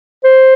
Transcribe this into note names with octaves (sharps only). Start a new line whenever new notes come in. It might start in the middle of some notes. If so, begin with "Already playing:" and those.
C5